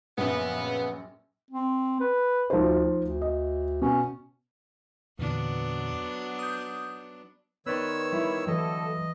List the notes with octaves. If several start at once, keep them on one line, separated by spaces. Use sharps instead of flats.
A#1 F#2 C#3 B3
C4
B4
D2 F3 D#4 C5
D2
D#5
B2 C#4
E2 A#2 D3 F#3 B3 D4
D#6 G6
D#3 B3 B4 C#5 D5 C6 E6
G3 E4
D3 E3 F#3 A3 A4 D#5